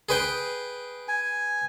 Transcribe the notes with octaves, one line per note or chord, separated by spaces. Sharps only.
G#4 B4 G5
G#5